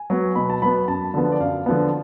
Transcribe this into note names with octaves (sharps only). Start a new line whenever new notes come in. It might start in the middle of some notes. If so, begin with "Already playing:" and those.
Already playing: G#5
F#3 B3
B2 B5
A5
F#3 B3 B5
F#2 A5
D3 F3 B3
D5
F#2 F5
D3 F3 B3